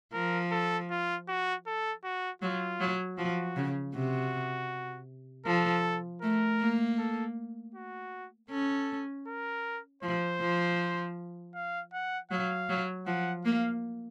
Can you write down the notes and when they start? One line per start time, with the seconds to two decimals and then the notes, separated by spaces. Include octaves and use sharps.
0.13 F3 A#4
0.51 A4
0.90 F4
1.28 F#4
1.67 A4
2.04 F#4
2.42 F#3 F4
2.80 F#3
3.17 F3 F#4
3.56 C#3
3.94 C3 F#4
5.46 F3 A4
6.22 A3 A#4
6.60 A#3
6.98 A4
7.74 F#4
8.50 C#4 A4
9.27 A#4
10.02 F3 C5
10.41 F3
11.55 F5
11.93 F#5
12.31 F#3 F5
12.69 F#3
13.06 F3 F#5
13.44 A#3 F5